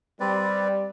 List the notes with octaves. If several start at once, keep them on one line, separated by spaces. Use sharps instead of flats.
G3 C4 B4 D5